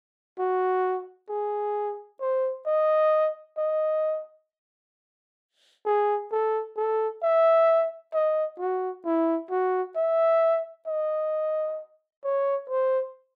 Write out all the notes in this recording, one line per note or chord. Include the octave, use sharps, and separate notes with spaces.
F#4
G#4
C5
D#5
D#5
G#4
A4
A4
E5
D#5
F#4
E4
F#4
E5
D#5
C#5
C5